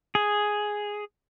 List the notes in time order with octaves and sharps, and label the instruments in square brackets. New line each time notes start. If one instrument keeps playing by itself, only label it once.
[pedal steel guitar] G#4